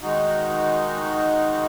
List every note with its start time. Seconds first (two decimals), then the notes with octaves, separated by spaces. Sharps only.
0.02 D#3 G#3 D#4 F#4